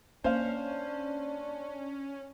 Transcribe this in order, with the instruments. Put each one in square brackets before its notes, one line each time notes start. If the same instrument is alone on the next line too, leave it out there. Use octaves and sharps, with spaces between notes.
[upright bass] A#3 [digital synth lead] C#4 [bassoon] D4 [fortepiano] C5 F5